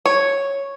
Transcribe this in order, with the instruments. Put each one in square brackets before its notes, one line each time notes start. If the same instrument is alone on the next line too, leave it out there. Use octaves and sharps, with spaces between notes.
[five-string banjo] C#5